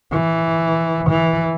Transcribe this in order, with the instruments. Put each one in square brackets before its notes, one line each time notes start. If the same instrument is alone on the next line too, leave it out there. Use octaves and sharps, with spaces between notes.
[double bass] E3
E3